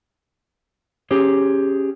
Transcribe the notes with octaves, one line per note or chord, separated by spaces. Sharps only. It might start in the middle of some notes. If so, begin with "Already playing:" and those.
C#4 G4 G#4 C#5